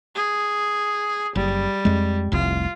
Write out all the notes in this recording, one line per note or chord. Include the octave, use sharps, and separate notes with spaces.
G#4
F#1 G3
F2 G#3
F1 C2 F4